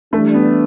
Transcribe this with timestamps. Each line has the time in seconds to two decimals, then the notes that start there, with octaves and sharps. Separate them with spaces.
0.13 E3 G3 A3 D4
0.34 B3